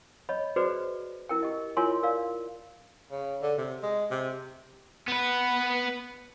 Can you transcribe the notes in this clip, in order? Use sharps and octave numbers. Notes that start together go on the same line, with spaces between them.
C#5 D#5 B5
F#4 G#4 B4 C5 D5
E4 A#4 G5
G4 D#5
E4 F4 A#4 C#5 G#5 C6
A#4 D5 F5
C#3
D3
C3
G#3
C3
B3 B4